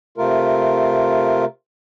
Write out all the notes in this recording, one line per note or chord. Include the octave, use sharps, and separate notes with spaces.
C3 A3 F4 A#4